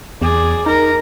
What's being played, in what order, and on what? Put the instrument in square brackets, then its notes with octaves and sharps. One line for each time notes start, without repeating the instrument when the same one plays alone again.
[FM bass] E2 [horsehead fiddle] G#4 D5
[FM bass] D#4 [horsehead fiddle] A#4